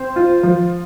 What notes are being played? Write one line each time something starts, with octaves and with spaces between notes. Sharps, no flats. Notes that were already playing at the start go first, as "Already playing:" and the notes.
Already playing: C4 C5
F4
F3